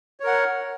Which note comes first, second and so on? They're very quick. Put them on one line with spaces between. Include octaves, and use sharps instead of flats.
C#5 A#4 F#5